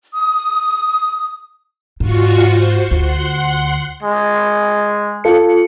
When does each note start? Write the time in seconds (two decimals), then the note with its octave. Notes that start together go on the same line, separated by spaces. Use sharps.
0.14 D#6
2.00 G#2 F4 F#4 C#6
2.44 C5
2.91 D2 F#5 C6
4.03 G#3
5.24 F4 A4 C#7